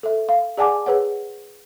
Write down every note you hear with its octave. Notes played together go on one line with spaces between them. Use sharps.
A4 E5
F5
G#4 D5 F#5 G#5 A5 D6
G#4 B4 C#5 F#5